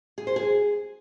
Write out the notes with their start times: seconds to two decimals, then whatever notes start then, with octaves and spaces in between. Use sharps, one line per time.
0.18 G#4
0.27 C5
0.36 G#4